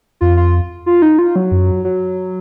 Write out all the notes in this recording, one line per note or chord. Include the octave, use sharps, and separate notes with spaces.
F2 F4
F4
F4
D#4
F4
F#3
F#2
F#3